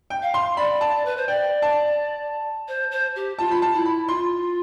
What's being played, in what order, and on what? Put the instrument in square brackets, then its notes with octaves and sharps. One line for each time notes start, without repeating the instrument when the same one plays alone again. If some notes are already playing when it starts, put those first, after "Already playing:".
[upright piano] G5
[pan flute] F5
[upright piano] C6
[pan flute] D5 [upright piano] B5
[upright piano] A5
[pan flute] B4
C5
[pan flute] D5 [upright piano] G5
[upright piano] A5
[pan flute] C5
C5
G4
[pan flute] F4 [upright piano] A5
[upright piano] B5
A5
[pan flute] E4
[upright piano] B5
[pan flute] F4 [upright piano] C6